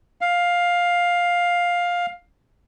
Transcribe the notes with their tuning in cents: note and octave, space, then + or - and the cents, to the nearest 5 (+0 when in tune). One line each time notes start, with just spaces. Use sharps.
F5 +10